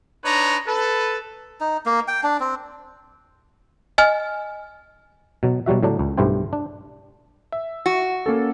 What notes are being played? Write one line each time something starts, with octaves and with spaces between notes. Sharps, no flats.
D4 D#4 B4 C#5 A#5
A4 B4
D#4
A#3
G5
D4
C4
D#5 G#5 F6
B2 F#3
B2 F#3 G3 F#4 E5
A2 D3 F#3 D4
C#2
B1 G2 A3 E4 C5 G5
D4
E5
F#4
A#3 C#4 A4